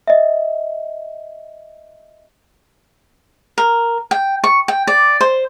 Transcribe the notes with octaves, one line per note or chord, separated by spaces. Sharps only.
D#5 E5
A#4
G5
C#6
G5
D5
C5